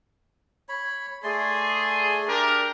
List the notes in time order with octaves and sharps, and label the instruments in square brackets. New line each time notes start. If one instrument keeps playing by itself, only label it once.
[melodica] C#5 B5
[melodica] A3 D5 C6 [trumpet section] G#4
[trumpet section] D4 G4 A#4